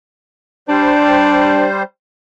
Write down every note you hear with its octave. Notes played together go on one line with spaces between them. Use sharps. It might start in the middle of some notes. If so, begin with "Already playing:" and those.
G3 D4 C5